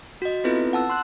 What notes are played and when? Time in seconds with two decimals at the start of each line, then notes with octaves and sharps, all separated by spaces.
0.22 F#4 D#5
0.44 B3 C4 E4 F4 A4 B4
0.73 F#5 A5 E6
0.89 C6 E6 F#6